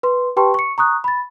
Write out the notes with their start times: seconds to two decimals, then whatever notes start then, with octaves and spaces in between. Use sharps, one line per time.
0.03 B4 C6
0.37 G4 B4 G5 A5 C6 C#6
0.54 C#6 C#7
0.78 A#5 C#6 D#6 F#6
1.04 B5 A6